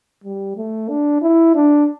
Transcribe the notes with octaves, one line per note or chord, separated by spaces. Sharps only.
G3
A3
D4
E4
D4